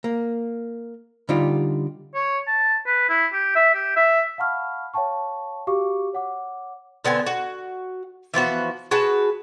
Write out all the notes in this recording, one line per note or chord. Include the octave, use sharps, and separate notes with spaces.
A#3
D3 G3 D#4 F4 G4
C#5
A5
B4
E4
G4
E5
G4
E5
F5 F#5 A5 B5 C#6 F6
C#5 F5 G5 A5 C#6
F#4 G4 F5 C#6 D6
C#5 F#5 D6
D3 B3 C4 G#5
F#4
E3 F3 B3 F#4
F#4 G#4 B4 A5